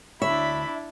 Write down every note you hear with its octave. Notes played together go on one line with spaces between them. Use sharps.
D2 D4 E4 C#5 E5 B5